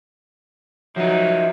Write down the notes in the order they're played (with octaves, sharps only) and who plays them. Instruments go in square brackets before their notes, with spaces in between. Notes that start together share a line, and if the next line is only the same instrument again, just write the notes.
[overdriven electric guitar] F3 D#4 [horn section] F#3 [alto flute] E5